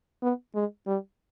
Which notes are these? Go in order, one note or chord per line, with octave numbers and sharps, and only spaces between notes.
B3
G#3
G3